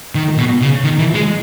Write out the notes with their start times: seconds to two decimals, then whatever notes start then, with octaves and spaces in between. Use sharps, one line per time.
0.15 D#3
0.38 B2
0.61 C#3
0.84 D#3
0.98 E3
1.14 G#3